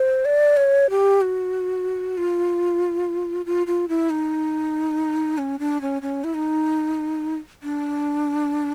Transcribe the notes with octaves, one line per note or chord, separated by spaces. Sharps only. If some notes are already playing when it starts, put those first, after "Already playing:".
Already playing: C5
D5
C#5
G4
F#4
F4
F4
F4
E4
D#4
C#4
D4
C#4
C#4
E4
D#4
D4